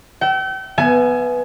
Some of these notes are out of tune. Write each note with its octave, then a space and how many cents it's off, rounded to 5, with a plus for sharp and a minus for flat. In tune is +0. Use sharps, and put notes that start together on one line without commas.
E5 +0 G5 -40
B3 +0 E5 +30 G#5 +20